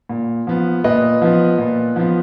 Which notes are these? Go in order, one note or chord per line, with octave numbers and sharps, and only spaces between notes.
A#2
F3 B3
A#2 B4 D#5
F3 B3
A#2
F3 B3